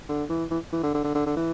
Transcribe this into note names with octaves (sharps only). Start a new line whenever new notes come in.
D3
E3
E3
E3
D3
D3
D3
D3
D3
E3